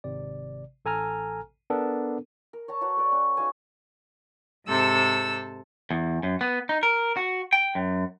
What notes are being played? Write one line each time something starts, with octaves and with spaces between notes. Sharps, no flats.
G#1 C3 D5
A1 A4 G#5 A#5 F6
B3 D4 A4 A#4
A#4
C#5 A5 A#5
F#4 B4 C#5 A#5
A4 B4 D5
C#4
D#4 F#4 F5 G#5
G#2 C3 A4 E6
E2
F#2
B3
D#4
A#4
F#4
G5
F#2